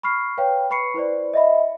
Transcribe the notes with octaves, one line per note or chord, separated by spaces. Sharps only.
B5 C#6 F6 C7
B4 C#5 F5 G5
B4 B5 C#6 C7 C#7
E4 B4 C5 D5
D#5 E5 B5